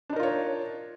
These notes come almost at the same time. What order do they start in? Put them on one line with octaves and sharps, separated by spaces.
D4 D#4 A#4 F4 C#5